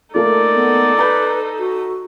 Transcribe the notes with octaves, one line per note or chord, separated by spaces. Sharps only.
A3 A#3 D#4 F4 A4 D5
B3
B4 A#5 B5 G6
F#4